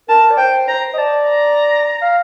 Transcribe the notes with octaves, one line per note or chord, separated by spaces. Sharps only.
A#4 A5
D5
C5 G5
C5 A#5
D#5
D5 A5
A#5
F5